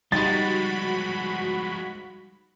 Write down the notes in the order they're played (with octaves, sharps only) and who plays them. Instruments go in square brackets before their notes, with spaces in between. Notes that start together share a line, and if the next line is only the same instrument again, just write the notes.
[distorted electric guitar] F3 G#3 [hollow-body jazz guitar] G3 D#4 C6 [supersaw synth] F#4 B5 [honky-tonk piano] A6